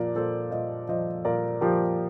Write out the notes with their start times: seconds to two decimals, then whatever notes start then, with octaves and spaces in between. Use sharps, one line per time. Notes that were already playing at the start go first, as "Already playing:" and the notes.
Already playing: A#2 F3 A#4 D5
0.15 A#2 A4 C5
0.51 A#2 C5 D#5
0.89 F3 C5 D#5
1.25 A#2 A#4 D5
1.61 F3 G4 A#4